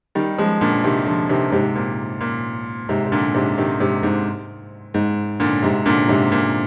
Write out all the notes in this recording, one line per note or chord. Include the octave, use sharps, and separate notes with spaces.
D#3 G3
F3 G#3
A#2 D3
C3 D#3
D3 F3
C3 D#3
G#2 C3
A#2
A#2
G#2 C3
C3
A#2 D3
G#2 C3
C3 D#3
G#2 C3
G#2
G#2
A#2 D3
G#2 C3
A#2 D3
G#2 C3
A#2